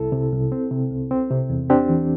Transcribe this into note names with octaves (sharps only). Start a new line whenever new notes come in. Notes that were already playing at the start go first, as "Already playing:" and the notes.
Already playing: C2 E4 A4
C3
C2
C4
C3
C2
C4
C3
E2
C4 D4 G4
E3